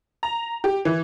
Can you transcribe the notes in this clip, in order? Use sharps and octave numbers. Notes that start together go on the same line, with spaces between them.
A#5
G4
E3